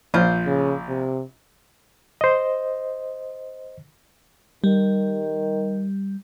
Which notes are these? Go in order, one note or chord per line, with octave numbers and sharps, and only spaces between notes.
A#1 F4 C5
C#3
C3
C5 D#5
D#3 G3